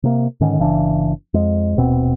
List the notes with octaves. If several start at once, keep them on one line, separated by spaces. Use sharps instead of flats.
C3 A#3
G#2 D3 D#3 C#4
G1 C#3 E3 D4
F2 G#3
D#1 B2 C4